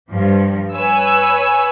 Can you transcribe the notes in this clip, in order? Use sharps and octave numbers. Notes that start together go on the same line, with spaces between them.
G2 F3
B4 C#5 G#5 E6